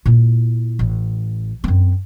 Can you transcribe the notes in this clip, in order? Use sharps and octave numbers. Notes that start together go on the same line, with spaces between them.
A#2 E4
A1
F#2 C4